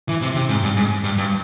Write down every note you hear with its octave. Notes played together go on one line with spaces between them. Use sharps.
E3
C3
C3
G#2
G2
G#2
G2
G2